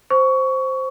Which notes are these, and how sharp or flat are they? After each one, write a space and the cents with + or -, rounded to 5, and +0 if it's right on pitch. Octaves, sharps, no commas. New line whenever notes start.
C5 +0 C#6 +20